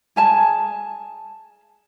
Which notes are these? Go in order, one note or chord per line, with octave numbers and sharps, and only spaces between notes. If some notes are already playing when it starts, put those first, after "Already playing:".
G#4 G#5 A5